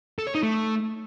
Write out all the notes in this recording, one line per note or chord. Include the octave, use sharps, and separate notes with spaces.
A4
C#5
D#4
A3